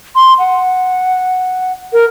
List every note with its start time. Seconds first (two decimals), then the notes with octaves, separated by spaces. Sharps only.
0.16 C6
0.39 F#5
1.93 A#4